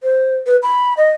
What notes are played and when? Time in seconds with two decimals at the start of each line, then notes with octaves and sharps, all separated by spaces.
0.03 C5
0.47 B4
0.63 B5
0.97 D#5